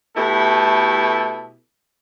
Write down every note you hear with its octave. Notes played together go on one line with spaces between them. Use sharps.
B2 A3 E4 G4 A4